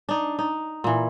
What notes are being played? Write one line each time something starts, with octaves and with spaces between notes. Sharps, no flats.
D4 D#4
D#4
A#2 E3